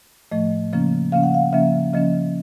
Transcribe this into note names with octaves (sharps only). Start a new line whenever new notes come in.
A2 F3 A3 D#5
C#3 F3 A#3 C#4
C#3 F3 A#3 C#4 F5
F#5
F5
C#3 F3 A#3 C#4 E5
C#3 F3 A#3 C#4 D#5